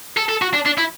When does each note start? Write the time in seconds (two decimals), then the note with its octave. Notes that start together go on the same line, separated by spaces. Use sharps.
0.17 A4
0.29 A4
0.42 F#4
0.53 D4
0.66 D4
0.78 E4